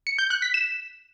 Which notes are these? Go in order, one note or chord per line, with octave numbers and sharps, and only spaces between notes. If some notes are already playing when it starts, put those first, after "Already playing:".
C#7
G6
F#6
B6
E7